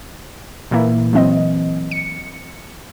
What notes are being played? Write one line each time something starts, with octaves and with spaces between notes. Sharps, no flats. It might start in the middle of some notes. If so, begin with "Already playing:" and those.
A#2 E3 A#3 E4
E3 F#3 C4 D#5
C#7